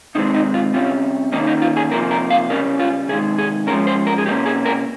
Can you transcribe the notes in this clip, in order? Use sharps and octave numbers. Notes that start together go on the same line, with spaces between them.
C3 D#3 G#3 C4 D#4
D#4
F4
C3 G3 C#4 F4
D#3 A#3 C#4 D#4
D#4
F4
G#4
C3 F3 A#3 A#4
A#4
F5
C#3 G3 C#4 A#4
F4
C3 D#3 G#3 G#4
G#4
F3 G#3 C#4 A#4
C5
A#4
G#4
C3 G3 A#3 C#4 G4
G#4
A#4